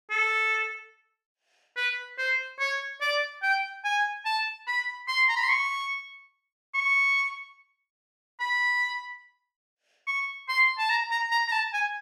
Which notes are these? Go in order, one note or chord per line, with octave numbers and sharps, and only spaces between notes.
A4
B4
C5
C#5
D5
G5
G#5
A5
B5
C6
A#5
B5
C6
C#6
C#6
B5
C#6
C6
A5
A#5
A#5
A#5
A#5
A5
G#5